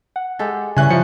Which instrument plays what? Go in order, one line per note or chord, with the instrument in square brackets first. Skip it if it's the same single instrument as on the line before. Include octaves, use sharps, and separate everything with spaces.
[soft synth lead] F#5
[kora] G#3 G4 A4
[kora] G2 E3 C#4 [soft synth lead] C#3 [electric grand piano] G#5 F#6
[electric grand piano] F3 [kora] F#3 [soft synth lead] C#7